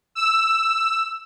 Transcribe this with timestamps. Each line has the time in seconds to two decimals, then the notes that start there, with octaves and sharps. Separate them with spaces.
0.15 E6